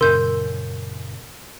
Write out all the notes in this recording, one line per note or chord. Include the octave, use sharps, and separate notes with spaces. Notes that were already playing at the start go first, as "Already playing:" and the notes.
F#2 A#2 C#3 A#4 C6 G6